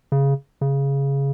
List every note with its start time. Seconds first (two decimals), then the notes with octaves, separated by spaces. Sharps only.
0.12 C#3
0.61 C#3